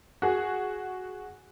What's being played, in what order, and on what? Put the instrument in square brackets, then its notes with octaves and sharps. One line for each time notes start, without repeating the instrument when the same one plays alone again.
[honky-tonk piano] F#4 G#4